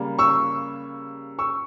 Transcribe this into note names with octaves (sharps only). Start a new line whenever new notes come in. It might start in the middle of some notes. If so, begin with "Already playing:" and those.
Already playing: C#3 G3 A#3
C#6 E6
C#6 E6